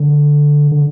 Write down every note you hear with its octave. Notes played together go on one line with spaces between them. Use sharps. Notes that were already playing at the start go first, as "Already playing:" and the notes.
Already playing: D3
D3